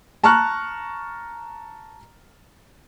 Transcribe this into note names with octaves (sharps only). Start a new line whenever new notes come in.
A5 A#5 C#6 F6 F#6